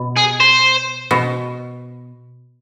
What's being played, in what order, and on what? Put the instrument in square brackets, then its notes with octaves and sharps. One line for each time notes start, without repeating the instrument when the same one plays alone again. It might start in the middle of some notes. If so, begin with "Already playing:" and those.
Already playing: [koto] B2
[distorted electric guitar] G#4
C5
[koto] B2